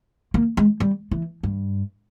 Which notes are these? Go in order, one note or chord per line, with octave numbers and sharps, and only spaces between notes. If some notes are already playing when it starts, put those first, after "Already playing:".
A#3
G#3
G3
E3
G2